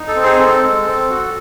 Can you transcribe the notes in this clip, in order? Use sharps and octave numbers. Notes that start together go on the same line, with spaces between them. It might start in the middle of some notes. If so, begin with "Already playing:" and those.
Already playing: D#4
A4
C4
G#4 C5
C4 A4
G#3
C4
F#4